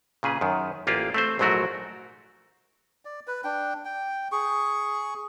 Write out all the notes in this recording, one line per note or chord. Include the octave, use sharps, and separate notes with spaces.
A#2 C#3 G#4 B4
F#2 D#3
A1 A#3 F4 G4 G#4
A3 C4 C5
A#1 G#2 F#3 A3 F#4 A#4
D5
B4
D4 G5
G5
G#4 C#6